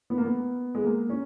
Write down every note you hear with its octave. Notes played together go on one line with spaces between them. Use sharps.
B3
A#3
B3
G#3
A#3
C#4